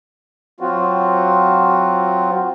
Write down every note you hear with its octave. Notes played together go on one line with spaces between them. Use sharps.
F#3 C4 F4 F#4